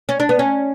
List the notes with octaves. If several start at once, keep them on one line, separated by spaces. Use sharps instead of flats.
C#4
D4
B3
C#4